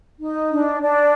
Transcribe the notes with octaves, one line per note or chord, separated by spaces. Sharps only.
D#4
D4
D4